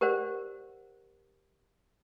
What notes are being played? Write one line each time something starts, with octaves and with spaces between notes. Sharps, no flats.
G4 A#4 C5 D5 F#5